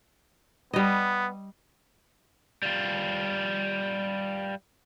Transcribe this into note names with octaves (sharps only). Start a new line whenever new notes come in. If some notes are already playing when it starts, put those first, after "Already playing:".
G3 B3 D#5
G3 F4